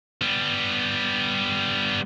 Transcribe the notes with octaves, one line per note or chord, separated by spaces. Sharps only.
G3 B3